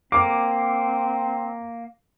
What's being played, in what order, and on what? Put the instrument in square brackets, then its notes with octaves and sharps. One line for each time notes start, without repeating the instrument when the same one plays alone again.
[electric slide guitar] A#3 [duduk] C4 [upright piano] D6